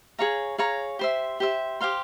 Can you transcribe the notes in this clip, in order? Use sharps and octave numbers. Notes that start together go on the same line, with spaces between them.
G#4 C#5 F5 A#5
G#4 C#5 F5 A#5
G4 C5 E5
G4 C5 E5
G4 C5 F5 C6